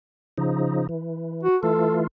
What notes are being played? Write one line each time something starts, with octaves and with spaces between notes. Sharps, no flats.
C#3 F3 D#4
E3
F#4
E3 A3 F4 A4